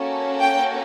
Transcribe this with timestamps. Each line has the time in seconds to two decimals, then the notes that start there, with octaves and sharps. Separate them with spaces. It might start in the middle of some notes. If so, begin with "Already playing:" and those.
Already playing: A#3 C#4 F#4 A4
0.40 G5